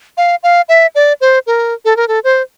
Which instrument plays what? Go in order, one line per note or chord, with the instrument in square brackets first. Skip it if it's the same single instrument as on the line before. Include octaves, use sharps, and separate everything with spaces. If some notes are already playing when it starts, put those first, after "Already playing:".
[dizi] F5
F5
E5
D5
C5
A#4
A4
A#4
A4
C5